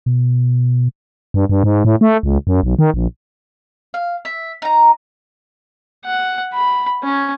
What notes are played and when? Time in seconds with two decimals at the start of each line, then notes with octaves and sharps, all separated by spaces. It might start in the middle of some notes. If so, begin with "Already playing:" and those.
0.06 B2
1.34 G2
1.49 G2
1.64 G#2
1.85 A2
2.01 A3
2.23 C#2
2.47 F#2
2.63 B1
2.79 D#3
2.94 A#1
3.94 F5
4.25 E5
4.62 D#4 A#5
6.06 F#5
6.54 B5
7.04 C#4